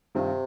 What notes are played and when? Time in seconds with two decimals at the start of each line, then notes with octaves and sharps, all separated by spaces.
0.15 G2 C3 D#3 C4 F4